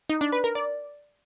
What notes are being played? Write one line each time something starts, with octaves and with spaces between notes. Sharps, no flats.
D#4
D4
B4
A#4
D5